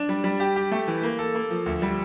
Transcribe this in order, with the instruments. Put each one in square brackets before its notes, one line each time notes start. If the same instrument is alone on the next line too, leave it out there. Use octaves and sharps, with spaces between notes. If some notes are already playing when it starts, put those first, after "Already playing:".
Already playing: [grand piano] D4
G3
G3
G4
G4
A3
E3
A#3
A4
A#3
F3
D2
G3